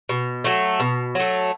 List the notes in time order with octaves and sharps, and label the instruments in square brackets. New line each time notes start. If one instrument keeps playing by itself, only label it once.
[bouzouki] B2
F#3 A3
B2
F#3 A3